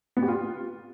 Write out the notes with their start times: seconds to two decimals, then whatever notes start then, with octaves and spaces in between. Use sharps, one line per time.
0.17 B3
0.22 G4
0.28 F4